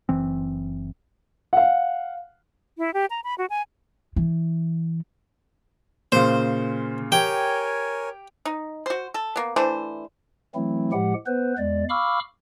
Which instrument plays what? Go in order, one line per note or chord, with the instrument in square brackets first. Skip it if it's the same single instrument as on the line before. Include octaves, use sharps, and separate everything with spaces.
[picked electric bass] F#1 E3 C4
[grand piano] F5 F#5
[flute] E4
G4
A#5
B5
F#4
G#5
[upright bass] E3
[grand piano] A#2 C#3 [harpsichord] C5
[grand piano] G4 [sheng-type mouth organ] A#4 C#5 G#5 [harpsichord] G5
[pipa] D#4
F#4 C5
A4
A#3 B3
E3 A3 D4 C5
[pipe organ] E3 F#3 A3 C4 E4
A2 F3 G#3 G4 F#5
B3 B4 C5
E2 G#3 D5
F5 B5 C#6 D6 E6 F6